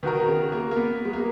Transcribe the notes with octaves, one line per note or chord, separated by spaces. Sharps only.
D#3 B3 F#4 A#4
C#3
A#3
A#3
B3
G#3
A#3